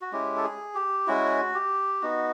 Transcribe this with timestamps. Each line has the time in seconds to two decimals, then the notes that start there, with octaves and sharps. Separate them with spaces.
0.01 F#4
0.12 G#3 C#4 E4 G4
0.37 A4
0.44 G#4
0.75 G4
1.07 G#3 C#4 E4 F#4
1.54 G4
2.01 B3 D#4 F#4